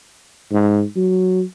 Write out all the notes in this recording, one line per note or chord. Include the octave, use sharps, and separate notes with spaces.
G#2
F#3